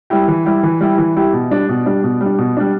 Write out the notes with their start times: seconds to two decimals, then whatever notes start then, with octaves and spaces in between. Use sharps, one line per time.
0.10 G3 E4 G4
0.28 E3
0.46 G3 E4 G4
0.63 E3
0.81 G3 E4 G4
0.98 E3
1.16 G3 E4 G4
1.33 B2
1.51 G3 D4
1.69 B2
1.86 G3 D4
2.04 B2
2.21 G3 D4
2.38 B2
2.57 G3 D4